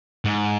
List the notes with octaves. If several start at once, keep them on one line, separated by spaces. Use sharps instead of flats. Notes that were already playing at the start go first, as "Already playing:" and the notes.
G#2